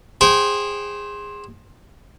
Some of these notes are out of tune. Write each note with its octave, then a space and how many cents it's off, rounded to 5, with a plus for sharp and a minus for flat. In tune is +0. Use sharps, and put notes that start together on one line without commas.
G#4 -20 C5 +15 G5 -30